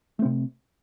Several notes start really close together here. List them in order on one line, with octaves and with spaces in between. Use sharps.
A3 C4 C3